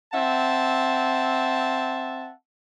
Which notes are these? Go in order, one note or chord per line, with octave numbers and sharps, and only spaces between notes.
C4 E5 F#5 A5